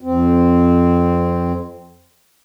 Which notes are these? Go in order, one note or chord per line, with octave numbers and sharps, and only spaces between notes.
F2 C4